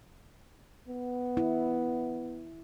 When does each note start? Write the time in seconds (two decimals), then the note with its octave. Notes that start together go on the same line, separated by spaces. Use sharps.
0.88 B3
1.37 E4